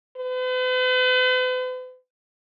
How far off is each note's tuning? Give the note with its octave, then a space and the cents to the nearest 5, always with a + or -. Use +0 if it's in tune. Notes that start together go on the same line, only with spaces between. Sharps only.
B4 +45